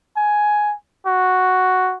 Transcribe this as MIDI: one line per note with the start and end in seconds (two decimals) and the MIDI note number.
0.16 0.75 80
1.06 1.96 66